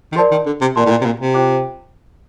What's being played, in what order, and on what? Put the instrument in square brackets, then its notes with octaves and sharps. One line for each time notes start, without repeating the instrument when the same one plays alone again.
[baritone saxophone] D#3
[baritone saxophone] F3 [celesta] A#4 D5 A5 C6
[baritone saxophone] D#3
D3
C3
[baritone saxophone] A#2 [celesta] A#4 D5 A5 C6
[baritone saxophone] A2
A#2
C3
A#2
C3
[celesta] F4 C5 G5 D6